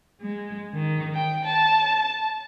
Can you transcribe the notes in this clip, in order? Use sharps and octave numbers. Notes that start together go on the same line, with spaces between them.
G#3
D#3
G5
A5